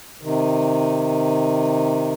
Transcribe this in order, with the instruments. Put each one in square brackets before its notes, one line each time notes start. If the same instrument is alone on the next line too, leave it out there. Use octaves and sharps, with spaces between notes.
[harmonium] C3 D#3